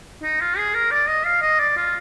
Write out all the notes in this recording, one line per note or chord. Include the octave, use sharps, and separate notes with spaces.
D#4
F4
G#4
A#4
D5
D#5
F5
D#5
D5
F4